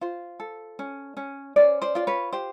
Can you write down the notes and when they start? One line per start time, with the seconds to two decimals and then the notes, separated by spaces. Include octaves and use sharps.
0.01 F4 C5
0.40 A4
0.79 C#4
1.17 C#4
1.56 C#4 C5 D5
1.82 C5 D5
1.95 F4 D5
2.07 B4 C#5
2.32 G4 C5